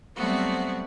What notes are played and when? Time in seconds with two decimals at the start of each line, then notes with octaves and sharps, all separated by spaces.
0.15 F#3 G3 A3 B3 C4 F#4